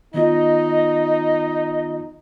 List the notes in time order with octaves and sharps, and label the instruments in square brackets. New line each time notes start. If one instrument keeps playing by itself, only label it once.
[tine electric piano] D#3 B3 F4 [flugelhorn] D#4 [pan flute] D#5